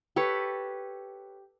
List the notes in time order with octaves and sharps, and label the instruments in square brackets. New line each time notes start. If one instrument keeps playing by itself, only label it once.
[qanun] G4 A4 B4 C#5